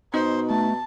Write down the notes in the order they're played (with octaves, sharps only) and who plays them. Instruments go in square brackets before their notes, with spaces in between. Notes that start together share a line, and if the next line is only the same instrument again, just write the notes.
[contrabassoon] B2 [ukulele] D#4 [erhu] C5
[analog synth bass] A3 [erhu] A5